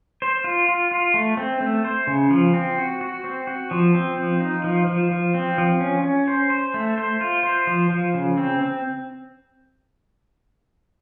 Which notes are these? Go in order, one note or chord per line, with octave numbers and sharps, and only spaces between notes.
C5
F4
F4
F4
A3
C4
A3
C5
C#3
F3
C4
F#4
F#4
C4
F#4
F3
C4
F3
D#4
F3
F3
F3
C4
F3
C#4
C#4
C5
C5
A3
C5
F4
C5
F3
F3
C#3
C4
C4